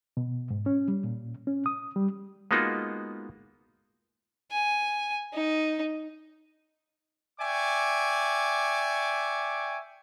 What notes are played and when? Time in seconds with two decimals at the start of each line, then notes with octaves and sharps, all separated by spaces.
0.17 B2
0.51 G#2
0.66 C#4
0.88 G3
1.04 A#2
1.47 C#4
1.66 D#6
1.96 G3
2.51 G#3 A#3 B3 D#4 F4 F#4
4.52 G#5
5.34 D#4
7.40 D5 E5 G5 G#5 C#6 D6